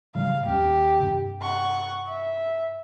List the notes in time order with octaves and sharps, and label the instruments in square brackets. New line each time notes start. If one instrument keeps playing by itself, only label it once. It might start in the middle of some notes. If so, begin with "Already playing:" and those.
[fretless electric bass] A2 C#3 G3 [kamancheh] F5
[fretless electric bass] D#2 C#4 [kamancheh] G4
[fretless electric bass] G2 C3
[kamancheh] F#5 C#6
E5